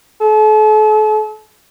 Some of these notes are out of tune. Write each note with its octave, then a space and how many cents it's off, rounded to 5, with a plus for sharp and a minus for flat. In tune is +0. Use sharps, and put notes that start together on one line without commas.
A4 -40